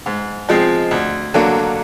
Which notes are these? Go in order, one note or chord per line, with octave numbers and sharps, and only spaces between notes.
G#2
F3 G#3 C4
D2
D3 F#3 A#3